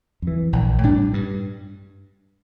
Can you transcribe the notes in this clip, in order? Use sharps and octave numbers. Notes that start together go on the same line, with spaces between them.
F2 E3
A#1
A2 G3 D4
G2